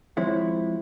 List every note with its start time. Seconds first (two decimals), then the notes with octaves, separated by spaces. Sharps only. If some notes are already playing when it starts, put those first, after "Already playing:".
0.17 F3 G#3 C4 E4 C#5